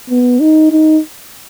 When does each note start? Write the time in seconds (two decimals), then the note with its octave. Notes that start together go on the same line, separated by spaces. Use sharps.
0.10 B3
0.40 D#4
0.71 D#4